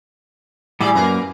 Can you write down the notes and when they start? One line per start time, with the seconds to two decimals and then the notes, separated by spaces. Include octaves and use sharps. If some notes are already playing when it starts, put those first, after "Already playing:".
0.80 A2 F#3 G3 G#4 D5
0.95 F#2 A#3 A#4 B4